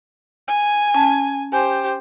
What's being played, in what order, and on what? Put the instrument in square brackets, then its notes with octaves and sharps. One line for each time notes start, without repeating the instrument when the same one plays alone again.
[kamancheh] G#5
[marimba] C#4 A5
[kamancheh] G4 C5 [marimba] G#5